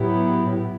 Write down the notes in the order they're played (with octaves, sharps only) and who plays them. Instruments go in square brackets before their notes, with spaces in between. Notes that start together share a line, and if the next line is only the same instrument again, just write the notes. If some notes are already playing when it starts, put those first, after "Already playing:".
Already playing: [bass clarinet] A2 [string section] F#3 B3 E4 G4
[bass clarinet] A2